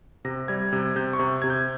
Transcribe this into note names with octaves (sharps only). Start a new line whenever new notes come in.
C3 A#6
G3 G#6
C3 G#6
C3 G6
C#6
C3
C3 G#6
G6